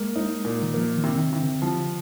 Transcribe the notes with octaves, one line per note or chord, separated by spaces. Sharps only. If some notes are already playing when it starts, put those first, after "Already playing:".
Already playing: G#3 A#3
D#4
A#2
D#3
F3 A#3
D#3
C3
D#3
C3
D3
F3